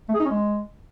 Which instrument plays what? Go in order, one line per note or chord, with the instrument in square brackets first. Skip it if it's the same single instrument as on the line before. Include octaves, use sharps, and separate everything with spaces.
[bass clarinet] A3
G#4
D#4
C#4
G#3